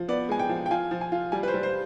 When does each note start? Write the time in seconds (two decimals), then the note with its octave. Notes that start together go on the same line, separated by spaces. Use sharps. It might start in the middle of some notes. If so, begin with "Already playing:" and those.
Already playing: F3
0.08 B3 D5
0.29 G#3 G#5
0.39 G5
0.49 F3
0.66 G5
0.71 F4 G#5
0.91 F3
1.01 G#5
1.12 F4
1.32 G3 G#5
1.43 B4
1.48 C5
1.54 G3
1.63 C5